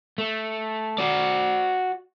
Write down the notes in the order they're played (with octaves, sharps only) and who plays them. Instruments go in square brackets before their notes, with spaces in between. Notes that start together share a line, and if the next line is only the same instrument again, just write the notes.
[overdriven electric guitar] A3
F#4 D5